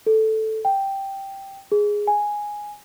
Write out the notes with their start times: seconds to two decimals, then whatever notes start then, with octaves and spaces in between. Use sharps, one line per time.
0.06 A4
0.65 G5
1.72 G#4
2.07 G#5